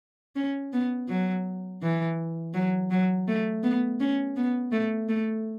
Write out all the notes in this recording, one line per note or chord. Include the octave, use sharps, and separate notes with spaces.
C#4
B3
F#3
E3
F#3
F#3
A3
B3
C#4
B3
A3
A3